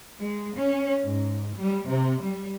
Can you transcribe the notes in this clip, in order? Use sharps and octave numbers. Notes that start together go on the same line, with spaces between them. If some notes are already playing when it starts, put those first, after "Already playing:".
G#3
C#4
G#2
G3
C3
G3